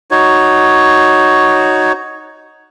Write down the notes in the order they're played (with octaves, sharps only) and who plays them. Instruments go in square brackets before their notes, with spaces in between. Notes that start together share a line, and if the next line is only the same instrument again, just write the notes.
[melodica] D#4 F#4 C#5